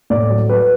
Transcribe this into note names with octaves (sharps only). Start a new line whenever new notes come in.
A2 D5
F#3
F#3 B4